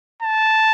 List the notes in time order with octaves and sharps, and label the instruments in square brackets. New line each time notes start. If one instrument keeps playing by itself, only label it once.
[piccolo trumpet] A5